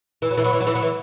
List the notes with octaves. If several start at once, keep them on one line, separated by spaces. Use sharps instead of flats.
E3
F#3
E3
F#3
E3
F#3
E3
F#3
E3